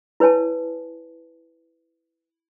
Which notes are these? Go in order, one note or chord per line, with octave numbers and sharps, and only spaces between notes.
E4 B4 C#5 G#5 A5